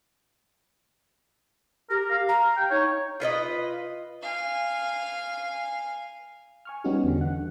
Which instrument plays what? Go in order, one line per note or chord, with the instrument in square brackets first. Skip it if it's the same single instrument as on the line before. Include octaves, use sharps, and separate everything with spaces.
[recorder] G4 [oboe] A#4
[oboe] F5
[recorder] A#5
[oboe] G5
[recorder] D#4 [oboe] C#5
[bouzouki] F4 B4 D5 D#5
[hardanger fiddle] F5 G#5
[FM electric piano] G#5 C#6 F6
G3 B3 C#4 D#4 F#4 G4
E2 D3
F#5